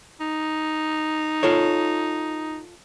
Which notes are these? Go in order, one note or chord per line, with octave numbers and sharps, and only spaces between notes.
D#4
F4 A4 C#5